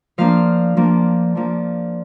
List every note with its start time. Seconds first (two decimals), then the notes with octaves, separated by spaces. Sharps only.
0.18 F3 A#3 D4 F5
0.77 F3 A#3 D4
1.35 F3 A#3 D4